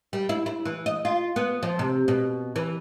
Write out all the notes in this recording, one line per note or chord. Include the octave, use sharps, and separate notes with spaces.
G3
E4
E4
E3
D#5
F4
B3
F3
C3
B2
E3